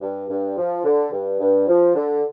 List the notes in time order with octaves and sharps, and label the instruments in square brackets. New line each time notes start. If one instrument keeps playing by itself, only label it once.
[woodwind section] G2
G2
F3
D3
G2
G2
F3
D3